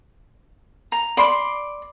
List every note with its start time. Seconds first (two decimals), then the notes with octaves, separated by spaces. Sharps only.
0.92 A#5
1.17 D5 B5 C6 D6